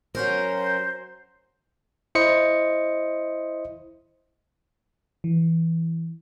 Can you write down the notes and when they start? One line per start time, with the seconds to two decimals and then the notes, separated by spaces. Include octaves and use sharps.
0.15 F#3 C#4 A#4 C5
2.15 E4 C5 D#5 C#7
5.24 E3